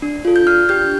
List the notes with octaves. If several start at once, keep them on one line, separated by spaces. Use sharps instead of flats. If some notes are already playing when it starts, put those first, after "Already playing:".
D4
F4 A4
G6
D4 F6
G4 G6